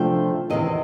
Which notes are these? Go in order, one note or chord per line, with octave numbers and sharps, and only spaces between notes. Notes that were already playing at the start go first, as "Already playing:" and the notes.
Already playing: C3 F3 A3 D4 G5
E2 C3 D#3 D#5